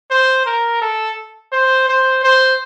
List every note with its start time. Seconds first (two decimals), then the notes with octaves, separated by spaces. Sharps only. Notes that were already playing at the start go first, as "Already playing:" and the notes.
0.10 C5
0.46 A#4
0.81 A4
1.52 C5
1.88 C5
2.23 C5